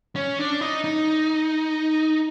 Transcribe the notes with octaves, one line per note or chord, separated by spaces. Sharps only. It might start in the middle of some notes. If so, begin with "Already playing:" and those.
C#4
D4
D#4
D#4